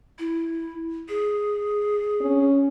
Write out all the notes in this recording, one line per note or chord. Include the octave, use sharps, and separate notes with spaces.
E4
G#4
C#4